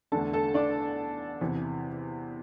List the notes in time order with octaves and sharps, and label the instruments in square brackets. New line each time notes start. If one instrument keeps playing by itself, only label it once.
[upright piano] E2 D3 A3 D4 A4 A5
A4 A5
D4 D5
E2 C3 E3